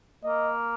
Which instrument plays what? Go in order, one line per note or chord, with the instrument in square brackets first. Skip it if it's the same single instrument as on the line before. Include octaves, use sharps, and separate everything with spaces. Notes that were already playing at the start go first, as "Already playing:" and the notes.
[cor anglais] A#3 [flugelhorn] D#5